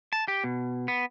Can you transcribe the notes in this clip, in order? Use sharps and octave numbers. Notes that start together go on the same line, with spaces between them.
A5
G4
B2
B3